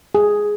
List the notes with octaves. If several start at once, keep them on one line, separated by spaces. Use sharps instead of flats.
G#4